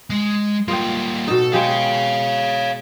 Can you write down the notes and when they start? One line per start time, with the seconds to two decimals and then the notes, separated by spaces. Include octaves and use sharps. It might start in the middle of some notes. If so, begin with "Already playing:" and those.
0.10 G#3
0.68 G3 A#3 F4 D#5 G5
1.28 B2 D#4 A4
1.53 G#3 G4 G#4 C#5 F5